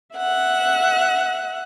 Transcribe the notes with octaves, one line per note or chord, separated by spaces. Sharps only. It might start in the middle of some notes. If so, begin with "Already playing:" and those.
E5 F#5 F#6